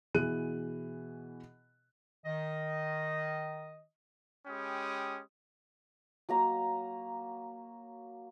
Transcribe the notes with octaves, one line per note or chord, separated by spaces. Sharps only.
B2 E3 G#4 F#6 D#7
D#3 D#5
G#3 C#4 G4 G5 B5 D#6
F#3 A#3 A#5